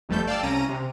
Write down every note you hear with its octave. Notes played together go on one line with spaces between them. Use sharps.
G1 F2 G3 A3 A4 G6
D5 F5 G5 A5 E6
C2 C#4 A#5 D#7
C3